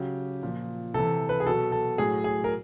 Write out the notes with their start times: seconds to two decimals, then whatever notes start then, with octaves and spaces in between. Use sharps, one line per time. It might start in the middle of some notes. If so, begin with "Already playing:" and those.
Already playing: C#3 F#3 G4
0.43 A#2 F3
0.94 C3 E3 A4
1.29 B4
1.40 G#4
1.46 B2 F#3 A4
1.72 A4
1.98 A2 F#3 G#4
2.24 G#4
2.44 A#4